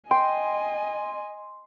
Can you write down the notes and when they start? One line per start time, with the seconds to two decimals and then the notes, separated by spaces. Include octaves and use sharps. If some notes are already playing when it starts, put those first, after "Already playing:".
0.11 D#5 G5 G#5 C6